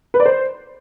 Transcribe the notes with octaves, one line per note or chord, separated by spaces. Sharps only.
B4
D5
C5